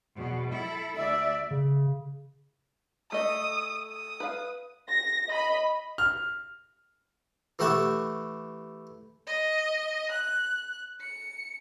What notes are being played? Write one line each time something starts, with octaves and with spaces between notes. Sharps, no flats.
E2 B2
E4 A4
D2 D5 E5
C#3
A3 D#5 D#6
D#6
B4 F5
A#6
D#5 B5
F6
E3 A3 G4 F#5 A5 C#6
D#5
F#6
C#7